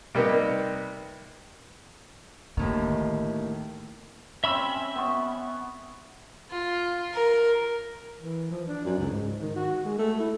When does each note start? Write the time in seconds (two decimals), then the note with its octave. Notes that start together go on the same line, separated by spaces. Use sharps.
0.15 C3 G3 A#3 B3 D#4
2.57 D#2 A2 D3 D#3
4.44 C4 C#4 E5 B5 E6
4.96 B3 C#6
6.51 F4
7.13 A#4
8.22 E3
8.50 F3
8.67 D4
8.85 F#2
8.98 C#2
9.11 G#2
9.41 D#3
9.55 F#4
9.84 G#3
9.98 A3
10.19 E4